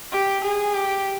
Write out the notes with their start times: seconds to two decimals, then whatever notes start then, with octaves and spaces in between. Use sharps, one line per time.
0.12 G4
0.44 G#4
0.74 G4